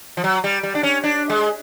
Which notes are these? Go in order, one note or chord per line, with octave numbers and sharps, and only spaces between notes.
F3
F#3
G3
G3
D4
C#4
D4
G#3